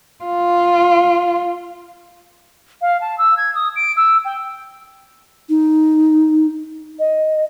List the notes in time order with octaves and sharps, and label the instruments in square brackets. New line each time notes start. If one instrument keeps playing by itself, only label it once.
[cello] F4
[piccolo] F5
A5
E6
G#6
D#6
D7
E6
G5
[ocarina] D#4
D#5